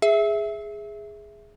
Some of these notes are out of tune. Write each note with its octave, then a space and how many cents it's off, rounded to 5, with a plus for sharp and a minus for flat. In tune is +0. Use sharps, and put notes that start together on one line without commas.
G#4 +0 E5 +0